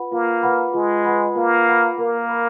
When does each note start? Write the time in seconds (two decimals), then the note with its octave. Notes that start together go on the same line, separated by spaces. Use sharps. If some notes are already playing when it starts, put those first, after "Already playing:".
Already playing: F4 B4 F#5 B5
0.12 A#3 F4
0.43 B4 F#5 B5
0.74 G#3 F4
1.05 B4 F#5 B5
1.36 A#3 F4
1.67 B4 F#5 B5
1.98 A#3 A#4
2.29 F5 B5